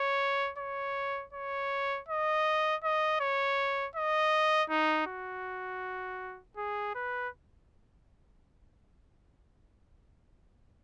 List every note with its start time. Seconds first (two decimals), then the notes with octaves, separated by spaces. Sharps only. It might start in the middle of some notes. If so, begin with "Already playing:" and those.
Already playing: C#5
0.58 C#5
1.33 C#5
2.08 D#5
2.83 D#5
3.20 C#5
3.96 D#5
4.69 D#4
5.07 F#4
6.57 G#4
6.95 B4